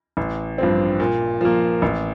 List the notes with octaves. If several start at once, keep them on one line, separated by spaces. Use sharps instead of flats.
A1
G2 F3 C4
A#2
F3 A#3
A1